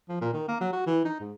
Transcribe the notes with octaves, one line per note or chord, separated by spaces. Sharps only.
F3
A#2
D#3
A#3
F#3
F#4
E3
D#4
G#2